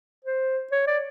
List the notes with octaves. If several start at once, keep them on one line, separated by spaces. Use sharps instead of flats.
C5
C#5
D5